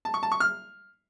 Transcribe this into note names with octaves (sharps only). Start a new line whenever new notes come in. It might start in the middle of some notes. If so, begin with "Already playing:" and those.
A5
C#6
A5
C#6
F6